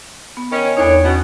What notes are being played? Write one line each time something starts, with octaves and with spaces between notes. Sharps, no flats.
B3
D#3 C#4
E2 A2 D4 D#4 C#5
B2 B3 C#4